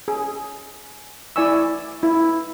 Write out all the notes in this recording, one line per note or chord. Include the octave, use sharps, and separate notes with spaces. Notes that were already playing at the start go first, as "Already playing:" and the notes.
G#4
E4 D5 G#5 C#6 E6
E4